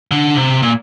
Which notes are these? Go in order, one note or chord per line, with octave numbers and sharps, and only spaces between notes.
D3
C3
A#2